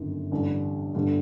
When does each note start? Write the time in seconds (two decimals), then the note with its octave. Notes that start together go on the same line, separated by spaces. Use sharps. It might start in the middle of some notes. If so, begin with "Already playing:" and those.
Already playing: G1 F#2 D#3
0.31 A1 G2 D3 G3 D4
0.95 G1 G2 D3 G3